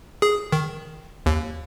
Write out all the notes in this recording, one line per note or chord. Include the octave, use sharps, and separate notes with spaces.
G#4
D#3
D#2